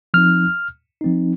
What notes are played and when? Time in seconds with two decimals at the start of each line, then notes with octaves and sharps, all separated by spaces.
0.14 F3 C4 D#4 F6
1.01 F3 C4 D#4